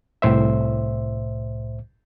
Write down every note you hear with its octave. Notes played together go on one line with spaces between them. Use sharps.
C2 A2 C5 E5